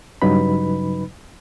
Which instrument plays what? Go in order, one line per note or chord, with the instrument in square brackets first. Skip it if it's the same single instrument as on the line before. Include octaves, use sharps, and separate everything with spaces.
[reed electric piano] G2 C#3 F#3 D#4 B4 B5